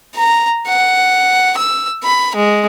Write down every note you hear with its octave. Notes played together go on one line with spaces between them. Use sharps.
A#5
F#5
E6
B5
G#3